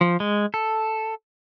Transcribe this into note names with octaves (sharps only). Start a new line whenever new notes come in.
F3
G#3
A4